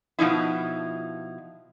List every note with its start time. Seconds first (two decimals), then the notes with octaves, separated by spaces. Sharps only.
0.19 B2 F3 D#4 E4